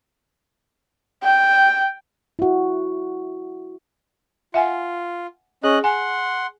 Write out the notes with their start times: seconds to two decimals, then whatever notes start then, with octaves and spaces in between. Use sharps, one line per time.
1.23 G5
2.39 E4 F#4
4.54 F4 E5 F#5 G#5
5.64 C#4 G#4 D#5 F#6
5.84 F#5 G#5 C6